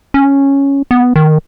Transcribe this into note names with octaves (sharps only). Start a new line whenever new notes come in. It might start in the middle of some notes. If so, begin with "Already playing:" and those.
C#4
B3
D#3